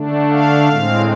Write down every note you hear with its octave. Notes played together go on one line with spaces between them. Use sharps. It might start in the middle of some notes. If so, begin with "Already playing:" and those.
Already playing: D3 A3 D4
F5
A2 G#3 C4